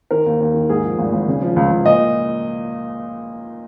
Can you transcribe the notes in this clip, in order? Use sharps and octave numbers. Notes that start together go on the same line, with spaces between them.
D#3 A#4
D#2
D#2
D#3
G#2 G#4
F3
G#1
G#1
C#3
F3
C#2
C#2
A#2 D#5